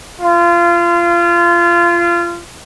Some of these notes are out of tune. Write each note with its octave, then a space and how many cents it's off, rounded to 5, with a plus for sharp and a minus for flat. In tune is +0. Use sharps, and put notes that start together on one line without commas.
F4 -25